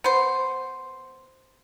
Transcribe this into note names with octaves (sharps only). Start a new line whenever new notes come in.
B3 C5